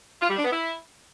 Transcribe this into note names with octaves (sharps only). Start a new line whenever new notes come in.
F4
G3
D4
B3
E4